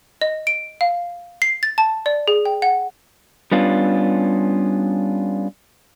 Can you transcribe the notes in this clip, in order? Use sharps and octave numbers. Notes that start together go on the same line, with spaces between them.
D#5
D7
F5
C7
A6
A5
D5
G#4
G5
F#5
G3 B3 C#4 D4 F4